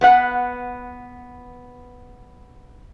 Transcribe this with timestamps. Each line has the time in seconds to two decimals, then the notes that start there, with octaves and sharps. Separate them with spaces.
0.01 B3 B4 F#5